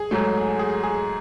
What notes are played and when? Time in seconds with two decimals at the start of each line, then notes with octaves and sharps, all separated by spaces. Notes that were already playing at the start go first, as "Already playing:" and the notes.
Already playing: G#4
0.11 G#2 F#3 A3
0.59 G#4
0.83 G#4